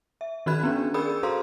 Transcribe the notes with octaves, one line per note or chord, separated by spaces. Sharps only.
E5
D#3 C#4 F#4 B5 F#6 G#6
B3 C#4 D4
G#4 A#4 D5 B5 D#6 E6
F#4 A4 C5 F5 A#5 C6